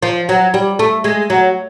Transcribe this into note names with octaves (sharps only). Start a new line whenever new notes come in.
F3
F#3
G3
A3
G#3
F#3